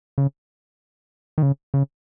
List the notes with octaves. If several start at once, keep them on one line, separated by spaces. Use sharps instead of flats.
C#3
D#3
C#3
C#3